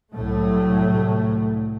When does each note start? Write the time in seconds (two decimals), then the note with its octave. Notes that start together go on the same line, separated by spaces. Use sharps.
0.14 C2 A2 F#3 A3